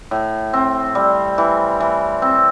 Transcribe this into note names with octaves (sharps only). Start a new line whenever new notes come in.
A2
C4
G3
E3
E3
C4